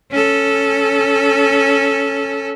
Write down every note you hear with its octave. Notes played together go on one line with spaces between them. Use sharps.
C#4 A4